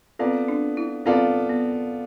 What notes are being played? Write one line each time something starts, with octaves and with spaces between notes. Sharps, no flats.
B3 C4 F4 A4 D5 F5
D4
E4
B3 C4 F4 A4 D5 F5
B3